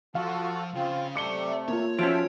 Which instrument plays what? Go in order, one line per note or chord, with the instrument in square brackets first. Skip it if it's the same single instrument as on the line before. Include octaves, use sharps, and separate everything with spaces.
[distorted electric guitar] F3 [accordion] F4 F#4 A4 [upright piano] F5
[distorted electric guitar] C#3 [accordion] C4 F4
[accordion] C3 A3 [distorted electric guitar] D5 B5 [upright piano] D6 C#7 G7
[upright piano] A#3 F4 [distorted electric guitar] C#5
[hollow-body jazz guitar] F3 C#4 [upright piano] F#4 D7 [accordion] A4 C5 E5